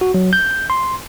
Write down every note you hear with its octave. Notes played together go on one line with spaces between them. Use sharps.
F#4
F#3
G6
C6